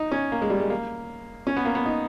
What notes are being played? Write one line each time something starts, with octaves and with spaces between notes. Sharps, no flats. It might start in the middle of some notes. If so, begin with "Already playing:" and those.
Already playing: D#4
C#4
A#3
G#3
G3
G#3
A#3
C#4
B3
A#3
B3
D#4